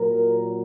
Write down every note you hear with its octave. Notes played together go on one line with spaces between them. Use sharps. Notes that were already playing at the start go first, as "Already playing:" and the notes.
Already playing: A#2 F#3 A#4